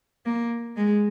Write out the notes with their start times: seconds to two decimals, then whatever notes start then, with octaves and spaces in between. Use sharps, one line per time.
0.26 A#3
0.77 G#3